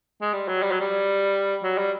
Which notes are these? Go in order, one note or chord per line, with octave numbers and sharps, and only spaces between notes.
G#3
G3
F#3
G3
F#3
G3
F#3
G3